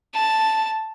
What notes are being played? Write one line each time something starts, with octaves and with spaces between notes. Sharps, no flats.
A5